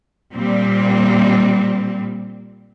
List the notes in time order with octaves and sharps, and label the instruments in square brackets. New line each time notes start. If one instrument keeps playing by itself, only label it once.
[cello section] A#2 G3 C4